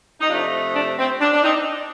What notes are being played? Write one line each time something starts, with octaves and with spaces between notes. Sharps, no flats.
D#4
C3 F3 A3 D4 F4
D4
C4
D4
D4
C4 D#4